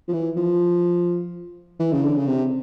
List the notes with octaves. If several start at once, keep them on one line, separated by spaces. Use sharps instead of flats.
F3
E3
F3
E3
C#3
D3
C#3
C3